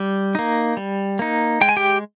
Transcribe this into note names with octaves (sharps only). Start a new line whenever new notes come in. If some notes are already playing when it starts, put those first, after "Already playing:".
Already playing: G3
A#3 D#4
G3
A#3 D#4
G#3 G5
G#5
G4 G5